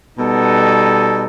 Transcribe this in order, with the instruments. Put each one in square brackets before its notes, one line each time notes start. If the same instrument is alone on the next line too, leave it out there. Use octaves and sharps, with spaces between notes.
[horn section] B2 G3 B3 D#4 A4